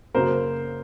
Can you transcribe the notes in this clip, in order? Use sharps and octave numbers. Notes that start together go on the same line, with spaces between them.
F#2 C#3 F#3 A#3 A#4 C5